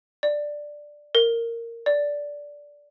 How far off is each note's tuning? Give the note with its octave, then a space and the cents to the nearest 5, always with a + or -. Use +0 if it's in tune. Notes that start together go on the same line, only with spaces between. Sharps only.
D5 +5
A#4 -10
D5 -10